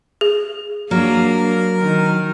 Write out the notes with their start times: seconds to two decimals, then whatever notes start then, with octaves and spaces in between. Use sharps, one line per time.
0.21 G#4
0.91 F#3 A#3 D4 A#4
1.82 D#3